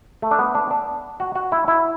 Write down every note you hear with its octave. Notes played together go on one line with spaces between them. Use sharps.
A3
D4
B3
D4
D4
F#4
F#4
E4
E4